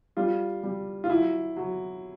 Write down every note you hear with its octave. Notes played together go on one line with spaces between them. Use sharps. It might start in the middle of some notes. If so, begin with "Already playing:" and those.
G3 F4
G3
F4
F#3 E4
F#3